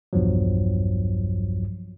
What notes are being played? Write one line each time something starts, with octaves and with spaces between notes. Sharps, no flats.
B1 E2 G2 F3 F#3